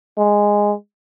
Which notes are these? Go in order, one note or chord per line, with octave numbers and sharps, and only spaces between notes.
G#3